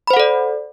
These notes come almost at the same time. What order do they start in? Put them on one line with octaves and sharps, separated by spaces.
B5 C5 F#5 A4 D5